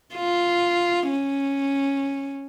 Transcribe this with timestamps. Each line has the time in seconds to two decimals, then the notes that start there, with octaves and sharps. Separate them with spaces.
0.15 F4
1.09 C#4